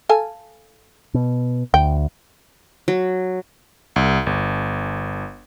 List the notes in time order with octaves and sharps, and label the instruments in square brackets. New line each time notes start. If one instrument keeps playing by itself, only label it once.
[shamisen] A4 F5 G#5
[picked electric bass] B2
[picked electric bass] D2 [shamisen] G5
[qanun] F#3
[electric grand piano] C2
G1